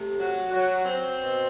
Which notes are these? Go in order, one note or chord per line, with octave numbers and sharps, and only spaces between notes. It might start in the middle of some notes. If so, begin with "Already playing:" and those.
Already playing: C3 A3
F#3 F#4
F#3 F#4
C4 C5
B2